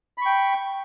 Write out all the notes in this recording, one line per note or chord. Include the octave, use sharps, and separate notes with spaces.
G5 B5 C#6